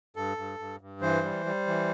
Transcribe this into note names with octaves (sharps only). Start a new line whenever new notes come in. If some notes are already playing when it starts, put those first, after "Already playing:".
G2 A4
G2
G2
G2
E3 C5
G3
G3
E3